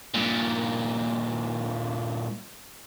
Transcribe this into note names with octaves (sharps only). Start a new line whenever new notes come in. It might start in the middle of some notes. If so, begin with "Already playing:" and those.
G2 A#2